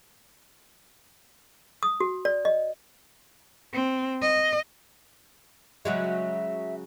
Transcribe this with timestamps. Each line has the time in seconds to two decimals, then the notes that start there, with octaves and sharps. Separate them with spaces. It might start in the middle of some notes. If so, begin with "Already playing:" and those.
1.83 D#6
2.00 F#4
2.25 D5
2.45 D#5
3.73 C4
4.22 D#5
5.85 C#3 F#3 G#3 E5